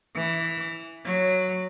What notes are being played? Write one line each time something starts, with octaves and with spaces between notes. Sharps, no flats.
E3
F#3